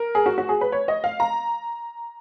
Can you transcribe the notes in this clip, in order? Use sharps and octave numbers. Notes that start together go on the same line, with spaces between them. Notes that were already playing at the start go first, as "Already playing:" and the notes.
Already playing: A#4
G#4
F#4
F#4
G#4
B4
C#5
D#5
F5
A#5